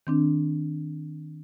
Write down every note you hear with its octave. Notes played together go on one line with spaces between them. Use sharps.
D#3 C4 D4